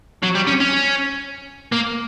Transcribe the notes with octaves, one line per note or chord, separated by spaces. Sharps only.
F#3
G3
C#4
C#4
A#3